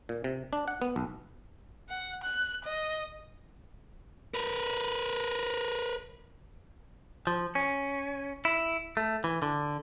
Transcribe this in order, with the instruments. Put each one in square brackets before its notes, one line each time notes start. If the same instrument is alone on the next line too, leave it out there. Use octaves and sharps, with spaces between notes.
[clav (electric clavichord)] A#2
C3
D4
F#5
B3
B1
[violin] F#5
F#6
D#5
[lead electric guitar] A#4 B4
[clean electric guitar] F3
C#4
E4
A3
E3
D3